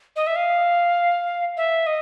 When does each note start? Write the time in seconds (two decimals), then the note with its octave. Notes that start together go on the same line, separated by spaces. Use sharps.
0.16 D#5
0.27 E5
0.36 F5
1.57 E5
1.86 D#5